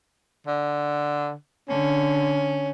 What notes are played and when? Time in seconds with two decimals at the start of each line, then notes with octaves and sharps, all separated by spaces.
0.47 D3
1.69 D3 C#4